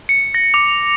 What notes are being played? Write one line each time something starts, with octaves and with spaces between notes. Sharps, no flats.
C#7
A#6
D6